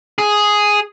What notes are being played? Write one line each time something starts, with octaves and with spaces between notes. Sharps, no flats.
G#4